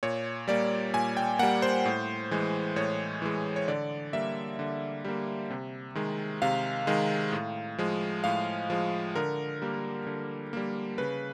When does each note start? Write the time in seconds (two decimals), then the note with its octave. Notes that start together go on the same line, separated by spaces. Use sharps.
0.03 A#2 C#5
0.48 G3 A#3 D5
0.93 A#2 G#5
1.17 G5
1.39 G3 A#3 F#5
1.62 C5
1.86 A2
2.31 E3 G#3
2.76 A2 C#5
3.22 E3 G#3
3.56 C#5
3.68 D3 D5
4.13 G3 A#3 E5
4.59 D3
5.04 G3 A#3
5.50 C3
5.95 D#3 G#3
6.42 C3 F5
6.87 D#3 G#3
7.32 A2
7.78 F3 G#3
8.24 A2 F5
8.70 F3 G#3
9.16 D3 A#4
9.62 G3 A#3
10.06 D3
10.53 G3 A#3
10.98 C#3 B4